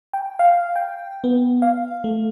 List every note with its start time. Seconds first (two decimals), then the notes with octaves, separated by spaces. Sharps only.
0.13 G5
0.39 F5
0.76 G5
1.24 B3
1.62 F5
2.04 A3